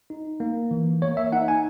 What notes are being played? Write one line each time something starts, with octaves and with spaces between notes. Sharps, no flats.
D#4
A#3
E3
A#3 C#5
E5
D#4 F#5
G#5